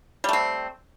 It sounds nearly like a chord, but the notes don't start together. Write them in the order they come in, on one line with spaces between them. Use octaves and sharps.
G3 A3 C4